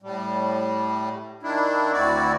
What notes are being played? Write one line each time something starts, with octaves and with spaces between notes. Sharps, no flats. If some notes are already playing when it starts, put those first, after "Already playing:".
A2 G3
D#3 D4 E4
D2 C4 E4 F#4 D5